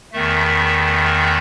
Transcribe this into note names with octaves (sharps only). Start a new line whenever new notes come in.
E2 D#3 A3 E5
E5